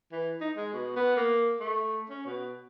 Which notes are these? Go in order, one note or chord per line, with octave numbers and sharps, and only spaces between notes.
E3
D#4
G#3
B2
B3
A#3
A3
C#4
B2